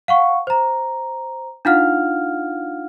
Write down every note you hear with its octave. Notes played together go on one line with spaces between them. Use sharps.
F5 F#5 C#6
C5 A#5
D4 D#4 F4 F5 F#5 F6